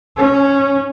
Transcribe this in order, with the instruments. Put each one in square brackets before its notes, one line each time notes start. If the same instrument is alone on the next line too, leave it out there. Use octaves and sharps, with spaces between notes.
[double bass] C#4